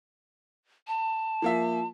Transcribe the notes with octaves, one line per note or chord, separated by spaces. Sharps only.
A5
F3 A#3 E5